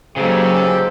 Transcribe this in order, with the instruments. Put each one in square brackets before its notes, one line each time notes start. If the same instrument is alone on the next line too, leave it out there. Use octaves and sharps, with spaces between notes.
[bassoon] G#2 [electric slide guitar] C#3 [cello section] F#3 A#3 [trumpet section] F4 G4 A4